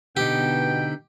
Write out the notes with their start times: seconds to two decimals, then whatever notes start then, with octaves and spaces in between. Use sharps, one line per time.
0.17 B2 D3 B3 D#4 G4 G5